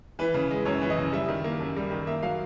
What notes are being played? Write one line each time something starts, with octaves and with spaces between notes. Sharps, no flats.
E3 B4
C#3
G#3
F#2 C#5
E3
D#5
C#3
G3 E5
D#3
A#3
F#2
G3
D#3
A#3 E5
F#3 F5